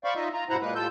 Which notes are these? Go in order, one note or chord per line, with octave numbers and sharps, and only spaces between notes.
C5 D5 F5 B5 C#6
D#4 F4 D#5 E5
F4 A#5
G2 B2 E4 C5 F#5 A#5
A#2 G#3 A#3 B4
A2 G3 F4 A4 E6 G6